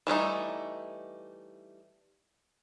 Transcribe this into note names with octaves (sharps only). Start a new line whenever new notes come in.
E3 G3 A3 D#4